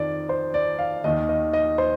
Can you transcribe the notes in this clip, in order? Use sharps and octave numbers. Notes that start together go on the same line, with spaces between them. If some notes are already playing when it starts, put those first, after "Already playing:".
Already playing: F2 D#3 D5
C5
D5
F5
D#2 D#3 D#5
D#5
D#5
C5